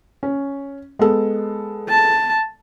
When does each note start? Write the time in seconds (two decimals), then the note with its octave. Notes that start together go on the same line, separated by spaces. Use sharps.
0.23 C#4
0.99 G#3 B3 A4
1.89 A5